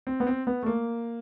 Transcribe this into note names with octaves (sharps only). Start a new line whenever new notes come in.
C4
B3
C4
B3
A3
A#3